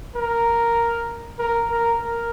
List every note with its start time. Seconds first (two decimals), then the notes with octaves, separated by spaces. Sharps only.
0.16 A#4
1.39 A#4
1.70 A#4
2.00 A#4